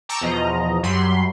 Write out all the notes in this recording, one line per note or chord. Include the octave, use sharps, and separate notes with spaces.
G5 A5 A#5 C#6 D6 E6
E2 B2 F3 D#5 A#5
F#2 F#3 G3 B5 C6